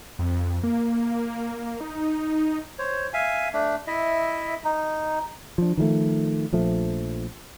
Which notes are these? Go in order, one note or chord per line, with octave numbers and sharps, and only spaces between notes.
F2
A#3
D#4
C5 C#5
E5 F5 G#5
A3 D4
E4 D#5 E5
D#4
F3 D4
D#3 F3 G#3 A3
A#1 F3 A3